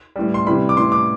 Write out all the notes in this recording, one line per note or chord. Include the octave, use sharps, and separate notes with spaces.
A2 E3 G3
C6
C3 E3 G3 B5
D6
A2 E3 G3 C6
D6